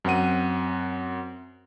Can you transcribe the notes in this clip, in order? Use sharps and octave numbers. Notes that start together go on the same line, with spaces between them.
F#2 C4 F#5 D#7